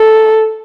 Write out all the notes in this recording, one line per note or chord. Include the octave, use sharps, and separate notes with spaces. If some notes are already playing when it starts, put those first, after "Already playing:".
Already playing: A4